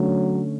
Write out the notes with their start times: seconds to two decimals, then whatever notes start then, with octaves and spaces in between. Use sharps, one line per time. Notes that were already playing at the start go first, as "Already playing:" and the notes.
Already playing: D3 F#3 A3 C#4